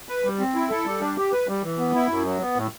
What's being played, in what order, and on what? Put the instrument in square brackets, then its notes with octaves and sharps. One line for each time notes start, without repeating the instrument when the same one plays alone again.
[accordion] B4
G3
C4
E4
A4
G3
D4
G4
B4
G3
E3
B3
E4
F#2
F#3
B3
A2